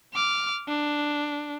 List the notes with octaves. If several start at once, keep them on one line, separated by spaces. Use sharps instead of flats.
D6 F6
D4